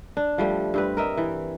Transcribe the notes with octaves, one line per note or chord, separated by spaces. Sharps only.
D4
F3 G3 A3
G2 C4 B4
A#4 D#5 E5
E3